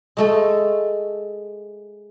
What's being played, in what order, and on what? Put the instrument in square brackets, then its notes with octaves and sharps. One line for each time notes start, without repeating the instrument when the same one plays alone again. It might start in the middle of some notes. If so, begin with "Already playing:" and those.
[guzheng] G#3 A3 A4